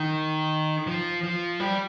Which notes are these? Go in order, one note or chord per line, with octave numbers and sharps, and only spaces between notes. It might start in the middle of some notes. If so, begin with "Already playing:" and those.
Already playing: D#3
F3
F3
G3